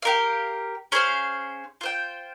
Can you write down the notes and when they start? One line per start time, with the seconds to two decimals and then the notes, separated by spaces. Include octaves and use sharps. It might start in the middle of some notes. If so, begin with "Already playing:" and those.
0.02 G4 A#4 F5
0.92 C#4 G#4 C5 F5
1.81 F4 C5 G5